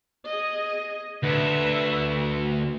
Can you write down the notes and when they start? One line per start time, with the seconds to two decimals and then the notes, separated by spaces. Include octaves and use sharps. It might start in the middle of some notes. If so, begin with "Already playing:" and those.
0.25 G#4 D#5
1.23 D2 B4 E5